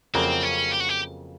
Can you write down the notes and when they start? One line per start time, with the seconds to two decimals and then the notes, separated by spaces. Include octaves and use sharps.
0.14 F2 C#3 F#3 A#3 C4
0.43 C#4
0.71 G4
0.80 F#4
0.89 G4